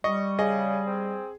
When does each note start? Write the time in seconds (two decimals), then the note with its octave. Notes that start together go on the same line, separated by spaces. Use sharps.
0.04 G3 D#5 C#6
0.39 C#3 G#4 D#5
0.87 C4